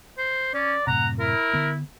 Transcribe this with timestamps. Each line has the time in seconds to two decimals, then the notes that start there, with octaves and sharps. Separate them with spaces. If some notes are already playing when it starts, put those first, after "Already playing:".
0.18 C5
0.54 C#4 D5
0.87 F#2 A2 C3 F#5 A#5
1.20 E4 A#4
1.53 D3 B3